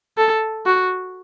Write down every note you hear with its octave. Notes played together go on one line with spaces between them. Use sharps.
A4
F#4